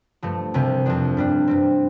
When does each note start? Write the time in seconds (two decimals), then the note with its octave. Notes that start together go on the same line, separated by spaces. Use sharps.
0.22 G2 F3 A3
0.54 C2 C3 G3
0.86 F2 F3 D4
1.17 G2 G3 D4
1.48 G2 G3 C4